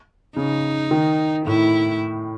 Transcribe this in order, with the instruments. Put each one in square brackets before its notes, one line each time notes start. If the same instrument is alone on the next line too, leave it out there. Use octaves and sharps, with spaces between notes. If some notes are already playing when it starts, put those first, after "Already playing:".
[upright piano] C#3 [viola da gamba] D#4
[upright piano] D#3
[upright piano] A2 [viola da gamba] E4